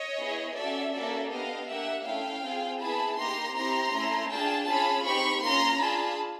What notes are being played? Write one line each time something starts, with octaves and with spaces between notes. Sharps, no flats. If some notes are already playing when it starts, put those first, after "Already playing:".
Already playing: C#5 D#5
B3 E4 G#4
C#4 F#4 A4 D5 E5
A#3 C#4 F#4 A4 D5 E5
B3 D4 G4 D#5 F5
A#3 D4 G4 E5 F#5
A3 C#4 E4 F5 G5
C4 F4 G#4
B3 E4 G#4 A5 B5
A#3 D#4 G4 A#5 C6
C4 E4 G4 A#5 C6
A3 C#4 E4
D4 F4 G#4 G5 A5
C#4 F4 G#4 A5 B5
C4 D#4 G4 B5 C#6
A#3 C#4 F4 A#5 C6
D4 F4 G#4 A5 B5